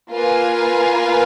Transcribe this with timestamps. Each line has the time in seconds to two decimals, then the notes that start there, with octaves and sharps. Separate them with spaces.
0.12 A#3 F4 B4 F5 G#5